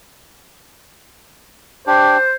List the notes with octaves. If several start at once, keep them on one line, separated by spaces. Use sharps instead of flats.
D4 G4 C5